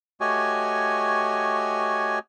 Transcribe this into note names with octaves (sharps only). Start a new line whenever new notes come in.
A3 F#4 G4 C#5 D#5 G#5